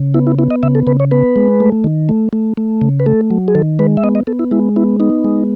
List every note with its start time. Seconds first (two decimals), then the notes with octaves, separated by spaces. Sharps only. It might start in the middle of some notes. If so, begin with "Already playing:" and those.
Already playing: C#3
0.14 B3 E4
0.27 E4
0.39 B3 E4
0.51 D#5
0.63 C#3 E5
0.75 A4
0.87 C#3 B4
1.00 C#5
1.11 B3 B4
1.36 G#3
1.60 A3
1.84 D#3
2.09 A3
2.33 A3
2.57 A3
2.81 C#3
3.00 B4
3.06 A3 A4
3.31 F#3
3.48 G#4
3.55 D#3 A4
3.79 G#3 B4
3.97 E5
4.03 B3 D#5
4.15 D#5
4.27 B3 A4
4.39 E4
4.51 G#3 E4
4.76 B3 E4
5.00 B3 D#4
5.24 G#3